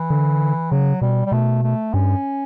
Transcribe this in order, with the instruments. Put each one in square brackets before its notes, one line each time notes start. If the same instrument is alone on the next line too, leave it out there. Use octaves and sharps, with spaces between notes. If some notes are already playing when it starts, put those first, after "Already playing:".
Already playing: [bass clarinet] E3
[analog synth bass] D3
[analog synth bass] C#3 [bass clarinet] F#3
[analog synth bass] B2 [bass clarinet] G3
[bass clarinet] G3
[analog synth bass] B2 [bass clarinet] A3
[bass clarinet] A3
[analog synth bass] G2 [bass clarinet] C#4